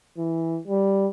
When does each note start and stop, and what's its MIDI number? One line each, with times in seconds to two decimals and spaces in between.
0.18 0.59 52
0.68 1.08 55